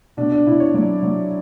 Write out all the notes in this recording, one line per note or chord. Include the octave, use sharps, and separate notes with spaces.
B2 D4
D4
B2 E4
C#5
F#3 D5
F#3